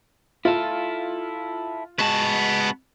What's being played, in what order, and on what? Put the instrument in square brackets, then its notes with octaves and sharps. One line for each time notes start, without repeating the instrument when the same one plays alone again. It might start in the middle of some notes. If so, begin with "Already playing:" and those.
[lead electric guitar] E4 A4 [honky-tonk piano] F4
[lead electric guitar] G#3 F#4 [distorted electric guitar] B3 A5